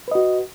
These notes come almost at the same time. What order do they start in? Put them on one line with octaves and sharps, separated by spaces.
B4 D#5 F#4